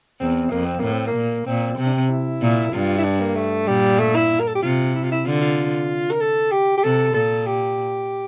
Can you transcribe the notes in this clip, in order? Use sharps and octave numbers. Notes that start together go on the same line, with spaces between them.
E2 C4
F2 A#3
C4
A2 A#3
C4
A#3
A#2
A#2 C4
C3 C4
D4
C4
E4
A#2
G2 F4
E4
D4
A#3
A3
A#2 G3
A3
E4
A#4
A4
G4
C3 F4
E4
F4
E4
D3 F4
F4
A#4
A4
G4
G4
C3 A4
A#2 A4
G4